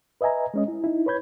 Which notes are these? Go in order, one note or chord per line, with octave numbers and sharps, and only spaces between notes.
B4 D#5 E5 G#5 A#5
G#3 C#4 D#5
E4
D#4 E4
B4 C#5 B5 G6 G#6